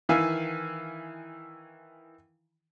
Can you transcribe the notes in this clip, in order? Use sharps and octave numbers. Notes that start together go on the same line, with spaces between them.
D#3 E3 E4 E5 F5 G#5